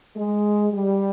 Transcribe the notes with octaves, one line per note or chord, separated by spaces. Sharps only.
G#3
G3